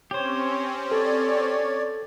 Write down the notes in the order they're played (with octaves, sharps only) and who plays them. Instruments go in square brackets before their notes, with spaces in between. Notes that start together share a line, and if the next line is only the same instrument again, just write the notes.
[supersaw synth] C4 C#4 [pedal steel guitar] G4 C5 [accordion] C#5
[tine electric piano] A4 [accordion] C#5 D5